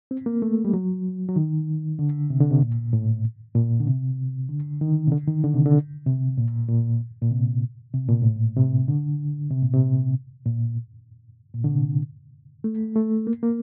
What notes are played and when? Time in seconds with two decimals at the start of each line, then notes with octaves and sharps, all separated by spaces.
0.11 C4
0.26 A#3
0.42 A3
0.65 G3
0.73 F#3
1.29 F#3
1.36 D#3
1.99 D3
2.30 C3
2.40 D3
2.51 C3
2.61 A#2
2.93 A2
3.55 A#2
3.80 D3
3.87 C3
4.49 D3
4.81 D#3
5.07 C3
5.12 D3
5.27 D#3
5.44 D3
5.54 C3
5.66 D3
6.06 C3
6.37 A#2
6.69 A#2
7.21 A#2
7.31 C3
7.94 C3
8.08 A#2
8.22 A2
8.36 A#2
8.57 C3
8.88 D3
9.51 C3
9.63 A#2
9.73 C3
10.45 A#2
11.54 A#2
11.64 D3
11.70 C3
12.64 A3
12.96 A3
13.27 A#3
13.43 A#3